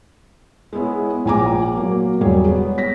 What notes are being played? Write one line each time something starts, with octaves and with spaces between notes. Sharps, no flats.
G#3 B3 E4 C#5
A#1 A#2 G#5 A#5 D6
F#3 A#3
E1 F#3 G3 G#4 C#5
B3
A#6 B6